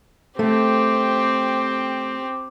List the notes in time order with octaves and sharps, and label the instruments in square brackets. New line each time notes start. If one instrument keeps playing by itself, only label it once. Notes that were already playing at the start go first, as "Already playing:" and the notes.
[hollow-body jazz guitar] A3 [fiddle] C4 G4